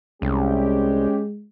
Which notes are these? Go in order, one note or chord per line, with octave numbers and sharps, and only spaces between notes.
C2 G#3 C#4 G4